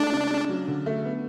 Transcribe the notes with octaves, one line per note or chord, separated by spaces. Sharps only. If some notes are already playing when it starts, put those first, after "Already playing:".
Already playing: G#3 A3 D4
C#3
C#3
F#3
D3
A3
B3